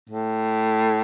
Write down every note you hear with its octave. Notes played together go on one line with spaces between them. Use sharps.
A2